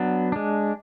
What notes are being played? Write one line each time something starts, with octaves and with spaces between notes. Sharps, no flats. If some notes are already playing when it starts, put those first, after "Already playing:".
Already playing: F#3 B3 D4
G#3 D4